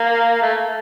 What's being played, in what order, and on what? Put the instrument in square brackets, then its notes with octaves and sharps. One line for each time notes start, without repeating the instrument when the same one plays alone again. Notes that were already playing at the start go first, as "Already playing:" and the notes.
Already playing: [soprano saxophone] A#3
A3